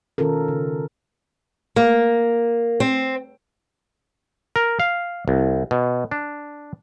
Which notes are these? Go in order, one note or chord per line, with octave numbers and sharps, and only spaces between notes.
B2 D#3 C#4 F4 A4 A#4
C#3
A#3
C4
A#4
F5
C2
B2
D4